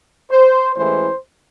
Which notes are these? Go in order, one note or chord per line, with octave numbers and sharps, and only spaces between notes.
C5
A1 A2 E3 G#3 C5